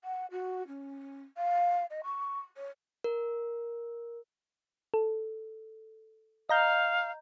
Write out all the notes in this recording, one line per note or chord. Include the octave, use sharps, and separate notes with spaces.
F#5
F#4
C#4
F5
D#5
C#6
C#5
A#4
A4
D#5 F5 A#5 G6